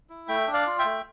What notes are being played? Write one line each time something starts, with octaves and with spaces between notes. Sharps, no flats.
E4
A3 E5 G5
D4
D5 F5
F4
E5 G5
A3